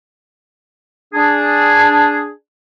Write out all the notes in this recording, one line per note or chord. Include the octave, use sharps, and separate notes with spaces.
D4 G#4